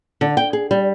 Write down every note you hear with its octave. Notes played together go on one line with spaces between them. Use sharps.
D3
G5
G#4
G3